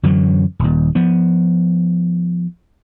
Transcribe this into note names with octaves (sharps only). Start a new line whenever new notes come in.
F#2 D3 E3 F#3
D#1 D#2
F3 B3